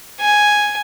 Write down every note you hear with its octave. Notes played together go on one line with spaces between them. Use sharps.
G#5